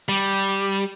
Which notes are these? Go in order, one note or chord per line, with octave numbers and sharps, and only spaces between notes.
G3